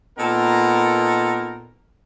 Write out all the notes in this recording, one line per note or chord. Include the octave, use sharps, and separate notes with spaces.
A#2 B3 D#4 A4 A#4